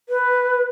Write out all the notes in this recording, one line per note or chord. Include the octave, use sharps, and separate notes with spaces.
B4